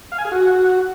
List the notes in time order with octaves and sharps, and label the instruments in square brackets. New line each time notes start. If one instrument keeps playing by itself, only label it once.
[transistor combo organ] F5
G#5
G#4
F#4